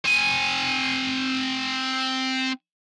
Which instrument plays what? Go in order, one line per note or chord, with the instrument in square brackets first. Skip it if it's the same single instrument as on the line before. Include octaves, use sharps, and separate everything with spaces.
[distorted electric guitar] C4 G#5